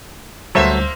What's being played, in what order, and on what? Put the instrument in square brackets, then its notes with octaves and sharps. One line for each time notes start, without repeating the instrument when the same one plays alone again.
[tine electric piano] D2 G3 [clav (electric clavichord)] F#3 A4 B4 [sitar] A#3 C5 E5